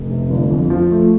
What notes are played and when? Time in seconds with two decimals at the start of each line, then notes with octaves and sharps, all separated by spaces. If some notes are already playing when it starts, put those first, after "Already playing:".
Already playing: F1
0.10 C3
0.30 G1
0.51 F2
0.70 F3
0.91 A3